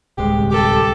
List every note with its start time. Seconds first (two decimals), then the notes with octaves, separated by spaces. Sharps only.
0.18 D1 C2 G#3 G4
0.51 G4 A4 D6